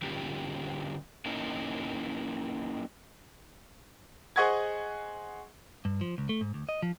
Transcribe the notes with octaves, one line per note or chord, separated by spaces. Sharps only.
D3 G3 C#4 F4 G4
A#3 C#4 D#4 E4 A4
G#4 C5 D#5 F#5 C#6 G#6
G2
F3
C#2
A3
G#2
D2
D#5
F3